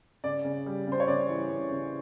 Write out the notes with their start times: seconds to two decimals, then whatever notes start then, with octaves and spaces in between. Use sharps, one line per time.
0.24 C#3 D5
0.45 C#3
0.66 G3
0.87 C#3 C5
1.00 C#5
1.08 C#3 D5
1.29 E3
1.49 C#3
1.71 C#3